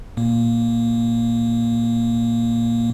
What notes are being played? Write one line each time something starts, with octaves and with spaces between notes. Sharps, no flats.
A#2 A#3